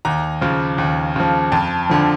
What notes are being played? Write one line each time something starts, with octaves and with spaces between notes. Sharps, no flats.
D#2 A#5
C#3 F3
D#2
C#3 F3
F2 A5
D3 F3